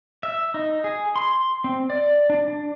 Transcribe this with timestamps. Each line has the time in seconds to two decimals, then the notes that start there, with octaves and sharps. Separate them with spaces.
0.23 E5
0.54 D#4
0.84 G#4
1.16 C6
1.64 C4
1.90 D5
2.30 D4
2.48 D4